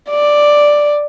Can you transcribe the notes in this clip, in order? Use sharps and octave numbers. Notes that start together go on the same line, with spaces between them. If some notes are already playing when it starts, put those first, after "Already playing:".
D5